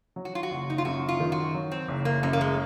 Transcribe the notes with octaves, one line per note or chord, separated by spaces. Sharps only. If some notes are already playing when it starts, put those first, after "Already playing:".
F#3
F#4
F4
F#4
F#1
D#4
F4
F#2 F#4
F4
D#3
F#4
F#3
C4
F#1
A#3
F#2 A#3
A#3
G#3